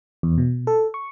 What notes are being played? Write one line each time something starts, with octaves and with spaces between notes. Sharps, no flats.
E2
B2
A4
C#6